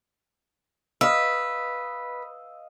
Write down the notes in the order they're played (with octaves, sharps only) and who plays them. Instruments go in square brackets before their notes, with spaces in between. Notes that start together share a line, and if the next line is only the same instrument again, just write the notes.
[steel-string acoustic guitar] B4 [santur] D#5 F5 [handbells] E6